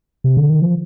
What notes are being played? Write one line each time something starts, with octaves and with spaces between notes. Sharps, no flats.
C3
D3
D#3
F3